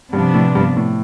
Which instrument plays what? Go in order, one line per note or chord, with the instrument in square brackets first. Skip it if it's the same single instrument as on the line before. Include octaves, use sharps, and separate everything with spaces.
[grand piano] G2 [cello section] C3 F3 B3 D4
[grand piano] A2
G2
A2